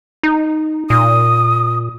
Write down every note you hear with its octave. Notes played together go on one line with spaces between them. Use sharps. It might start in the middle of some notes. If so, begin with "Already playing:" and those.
D#4
A#2 D#6